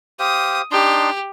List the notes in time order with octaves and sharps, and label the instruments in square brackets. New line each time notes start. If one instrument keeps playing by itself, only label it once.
[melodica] G4 C5 F5 [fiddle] D#6
[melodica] D4 D#4 C6 [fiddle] G4